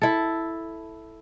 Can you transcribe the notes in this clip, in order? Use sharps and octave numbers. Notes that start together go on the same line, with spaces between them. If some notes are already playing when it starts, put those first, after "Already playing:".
E4 A4